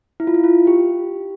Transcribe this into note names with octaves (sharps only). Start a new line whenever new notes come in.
E4
F4
E4
F4
G4